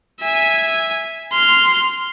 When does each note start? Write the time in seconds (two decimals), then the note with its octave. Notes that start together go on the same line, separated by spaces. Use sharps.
0.20 E5 G#5
1.32 C6 F6